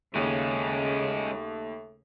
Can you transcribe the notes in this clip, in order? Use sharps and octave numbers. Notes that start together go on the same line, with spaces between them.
D#2 C#3 G#3 A3 C#4